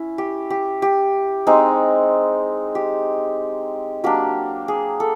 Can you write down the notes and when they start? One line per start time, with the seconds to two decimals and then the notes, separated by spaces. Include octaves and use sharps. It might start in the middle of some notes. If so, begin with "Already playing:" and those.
Already playing: C#4 E4
0.18 G4
0.50 G4
0.82 G4
1.47 G#3 C4 D#4
2.75 G4
4.04 F#3 A#3 D4 G4
4.68 G#4
5.00 A4